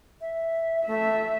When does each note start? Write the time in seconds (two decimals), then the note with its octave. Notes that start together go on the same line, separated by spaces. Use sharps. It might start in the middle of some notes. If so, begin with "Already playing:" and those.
0.21 E5
0.87 A3 E5